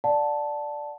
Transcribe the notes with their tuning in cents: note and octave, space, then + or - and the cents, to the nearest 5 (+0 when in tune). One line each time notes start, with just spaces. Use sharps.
D5 +0 F#5 -15 A5 +0